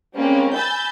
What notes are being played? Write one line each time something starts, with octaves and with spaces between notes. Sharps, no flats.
G3 G#3 A#3 C4 C#4
G#5 B5 E6 G6 A6